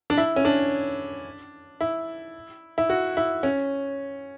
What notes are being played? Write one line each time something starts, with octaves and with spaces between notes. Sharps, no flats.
D4
E4
C#4
D4
E4
E4
F#4
E4
C#4